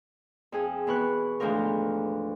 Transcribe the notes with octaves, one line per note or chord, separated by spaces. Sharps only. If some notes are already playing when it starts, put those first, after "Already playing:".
F2 G#4
B2 E3 B4 C#6 F#6
D2 G#2 E3 F3 A#4